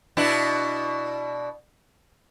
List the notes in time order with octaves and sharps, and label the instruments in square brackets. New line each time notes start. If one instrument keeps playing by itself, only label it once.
[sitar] B2 D4 E4